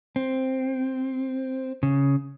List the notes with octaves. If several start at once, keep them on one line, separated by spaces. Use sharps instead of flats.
C4
C#3